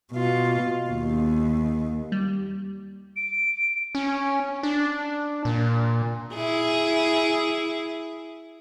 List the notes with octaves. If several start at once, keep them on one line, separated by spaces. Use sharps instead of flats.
B2 F4
D#2
G3
D7
C#4
D4
A#2
E4 G#4